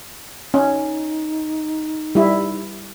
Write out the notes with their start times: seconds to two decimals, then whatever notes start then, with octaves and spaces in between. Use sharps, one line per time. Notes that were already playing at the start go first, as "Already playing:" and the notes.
0.54 C#4 D#4
2.15 G3 E4